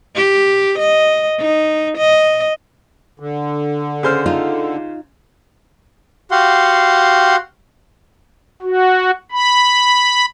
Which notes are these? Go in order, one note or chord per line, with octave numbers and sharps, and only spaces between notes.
G4
D#5
D#4
D#5
D3
C#3 C5 F6
D#4 F4
F#4 G4 F5 F#5 C6
F#4
B5